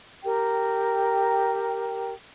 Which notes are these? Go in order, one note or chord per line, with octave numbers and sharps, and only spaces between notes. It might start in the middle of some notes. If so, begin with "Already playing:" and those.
G4 A#4 G5